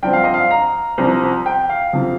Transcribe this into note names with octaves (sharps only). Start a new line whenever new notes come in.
G2 F3 C4 G5
F5
D#5
F5
A#5
C2 C3 F3 C4
G5
F5
F2 C3 F3